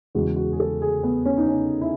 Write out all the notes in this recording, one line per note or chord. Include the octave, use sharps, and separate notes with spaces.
E2 C#3 G#3 F#4
F#4
G#4
A4
G#4
B3
C#4
D#4
C#4
E4